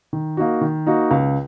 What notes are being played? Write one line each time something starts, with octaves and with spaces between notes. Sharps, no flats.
D#3
A#3 D#4 F#4
D#3
A#3 D#4 F#4
C#2